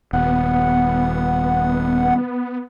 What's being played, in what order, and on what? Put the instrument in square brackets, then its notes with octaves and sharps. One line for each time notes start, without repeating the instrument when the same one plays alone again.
[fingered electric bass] D#1 [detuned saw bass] B3 [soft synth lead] F#5